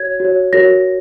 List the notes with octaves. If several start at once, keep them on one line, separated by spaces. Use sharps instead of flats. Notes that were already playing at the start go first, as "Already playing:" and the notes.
Already playing: F#4 C#5 G#6
F#4 C#5
F#4 A#4 C#5 A#6